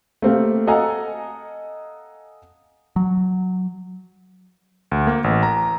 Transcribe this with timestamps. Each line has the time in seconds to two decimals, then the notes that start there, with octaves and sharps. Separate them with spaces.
0.22 A3 A#3 C4 G4 F5
0.67 A4 D#5 F5 F#5 G#5 A#5
2.96 F#3
4.91 D2
5.07 A#3
5.24 A1
5.43 A#5